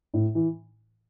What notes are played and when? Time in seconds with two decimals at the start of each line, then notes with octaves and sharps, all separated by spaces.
0.14 A2
0.35 E3